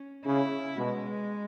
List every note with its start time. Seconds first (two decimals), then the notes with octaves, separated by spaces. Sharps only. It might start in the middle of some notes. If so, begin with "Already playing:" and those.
Already playing: C#4
0.26 C#3 E4
0.76 B2 G#3